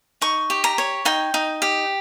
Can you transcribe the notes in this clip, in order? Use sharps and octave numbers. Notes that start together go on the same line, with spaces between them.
D#4 C#6
G4
A#5
C#5
D#4 G5
D#4
G4